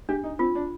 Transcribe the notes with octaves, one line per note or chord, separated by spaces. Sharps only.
D4 G4
D#4
C4 F4
D4